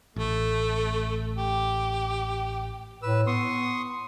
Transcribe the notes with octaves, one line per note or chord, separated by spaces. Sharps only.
A1 A3
G4
A2 B4 E6
B3 C6 C#6 D#6